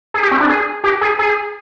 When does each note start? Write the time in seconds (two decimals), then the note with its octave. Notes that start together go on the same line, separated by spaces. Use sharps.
0.14 G#4
0.23 G4
0.31 C4
0.40 D4
0.49 G#4
0.84 G4
1.01 G#4
1.19 G#4